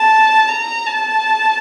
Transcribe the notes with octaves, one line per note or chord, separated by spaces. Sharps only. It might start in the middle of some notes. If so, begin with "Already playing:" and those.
Already playing: A5
A#5
A5